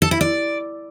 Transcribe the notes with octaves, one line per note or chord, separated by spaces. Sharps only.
A4
E4
D5